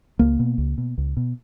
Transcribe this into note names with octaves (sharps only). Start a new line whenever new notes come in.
C#2 A#3
B2
C#2
B2
C#2
B2